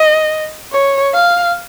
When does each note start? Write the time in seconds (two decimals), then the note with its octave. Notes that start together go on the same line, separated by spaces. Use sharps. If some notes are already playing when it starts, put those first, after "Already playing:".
Already playing: D#5
0.72 C#5
1.14 F5